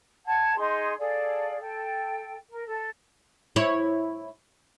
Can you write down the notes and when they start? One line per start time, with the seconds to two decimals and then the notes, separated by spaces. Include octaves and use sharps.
0.25 F#5 A5 G#6
0.57 D#4 G#4 C6
0.99 G#4 A4 D5 F5
1.60 A4 G5
2.50 A#4
2.66 A4
3.56 E4 C#5